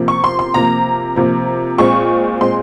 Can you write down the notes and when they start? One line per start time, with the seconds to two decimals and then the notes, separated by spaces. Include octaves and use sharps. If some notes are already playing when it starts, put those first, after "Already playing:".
Already playing: C3 F3 A#3
0.08 C#6
0.24 C6
0.39 C6
0.54 C3 F3 A#3 A#5
1.16 C3 F3 A#3
1.78 A#2 G#3 C4 C#6
2.40 A#2 G#3 C4 C6